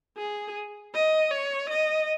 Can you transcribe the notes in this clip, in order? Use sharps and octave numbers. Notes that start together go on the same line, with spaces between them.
G#4
D#5
C#5
D#5